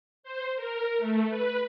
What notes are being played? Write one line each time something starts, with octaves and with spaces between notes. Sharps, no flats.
C5
A#4
A3
B4